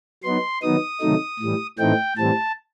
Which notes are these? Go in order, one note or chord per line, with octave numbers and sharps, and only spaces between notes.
F#3 B3 D#4 C6
D#3 F#3 B3 D#4 D#6
C3 D#3 F#3 A3 D#4
A2 E3 G3
A2 E3 A3 C4 D#4 G5
A2 E3 G3 C4 A5